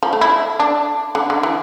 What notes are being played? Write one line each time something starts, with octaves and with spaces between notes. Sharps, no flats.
F3
A3
E4
D4
D3
D3
E3